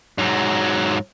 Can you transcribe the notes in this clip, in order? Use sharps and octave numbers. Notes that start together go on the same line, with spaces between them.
G#2 F#3